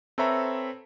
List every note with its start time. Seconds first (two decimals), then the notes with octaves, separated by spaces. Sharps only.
0.18 C4 A4 B4 C#5 E5 A#5